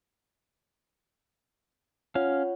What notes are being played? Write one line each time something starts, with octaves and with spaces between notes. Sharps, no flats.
C#4 F4 C#5 F5 F#5